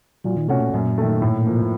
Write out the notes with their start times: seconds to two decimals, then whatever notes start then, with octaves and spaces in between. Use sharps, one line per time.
0.24 A#2 F#3
0.37 D#3
0.48 C3 A3 C#4 F#4
0.60 A#2
0.74 F#2 A#2
0.98 D#3 A3
1.22 A2
1.47 F3 A#3